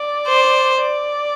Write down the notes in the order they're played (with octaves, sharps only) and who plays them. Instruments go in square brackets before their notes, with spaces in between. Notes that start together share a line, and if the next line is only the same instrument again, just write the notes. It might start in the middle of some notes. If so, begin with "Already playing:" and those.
Already playing: [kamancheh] D5
[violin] C5
[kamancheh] D5